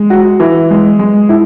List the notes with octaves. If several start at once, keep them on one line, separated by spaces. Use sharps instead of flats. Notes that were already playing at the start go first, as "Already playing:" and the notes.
Already playing: G#3
F#4
E3
G#3
G#3
E4